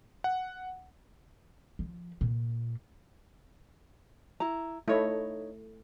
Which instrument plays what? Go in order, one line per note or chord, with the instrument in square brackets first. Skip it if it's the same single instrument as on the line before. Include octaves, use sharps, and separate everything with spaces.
[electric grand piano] F#5
[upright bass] F3
A#2
[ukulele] E4 A#5
[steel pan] A3 E4 [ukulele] D#4 C#5